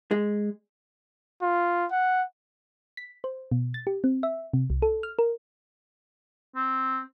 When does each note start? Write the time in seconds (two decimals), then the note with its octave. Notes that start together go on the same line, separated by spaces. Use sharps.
0.11 G#3
1.42 F4
1.91 F#5
2.97 B6
3.24 C5
3.52 B2
3.74 A6
3.87 G4
4.04 C4
4.23 E5
4.53 C3
4.70 C2
4.82 A4
5.03 F6
5.19 A#4
6.56 C4